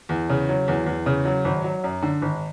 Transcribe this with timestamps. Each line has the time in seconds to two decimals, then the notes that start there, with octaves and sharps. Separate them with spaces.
0.09 E2
0.30 C#3
0.49 F#3
0.68 E2
0.86 E2
1.06 C#3
1.25 F#3
1.45 G#1
1.64 F#3
1.84 F#2
2.02 D3
2.22 G#1